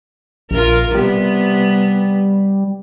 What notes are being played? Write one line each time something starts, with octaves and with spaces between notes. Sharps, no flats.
A#1 F4 A#4
C3 G3 B3